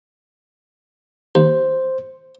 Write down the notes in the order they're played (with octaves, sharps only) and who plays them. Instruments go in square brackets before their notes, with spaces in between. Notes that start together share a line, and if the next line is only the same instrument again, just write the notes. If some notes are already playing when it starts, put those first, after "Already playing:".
[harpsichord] D#2 [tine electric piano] C5